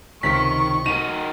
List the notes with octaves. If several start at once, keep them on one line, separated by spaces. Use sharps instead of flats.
C#2 C3 D#3 C#6 B6
D#4 F#4 A#4 D#7